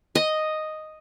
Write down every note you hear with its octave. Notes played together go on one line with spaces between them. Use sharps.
D#5